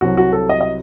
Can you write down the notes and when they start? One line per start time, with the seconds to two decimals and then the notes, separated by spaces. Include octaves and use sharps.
0.01 C2 C3 F#3 F#4
0.17 F#4
0.32 A4
0.49 D#5
0.61 D#5